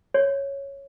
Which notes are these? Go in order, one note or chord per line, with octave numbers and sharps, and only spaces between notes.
C#5